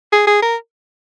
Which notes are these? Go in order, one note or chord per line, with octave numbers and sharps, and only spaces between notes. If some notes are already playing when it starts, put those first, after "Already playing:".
G#4
G#4
A#4